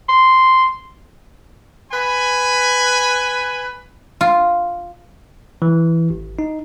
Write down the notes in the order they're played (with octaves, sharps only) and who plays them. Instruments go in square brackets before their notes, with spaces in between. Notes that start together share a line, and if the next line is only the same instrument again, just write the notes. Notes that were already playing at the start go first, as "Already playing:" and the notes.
[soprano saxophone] C6
[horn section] B4 G#5 B5
[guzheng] F4
[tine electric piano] E3
G#1
D#4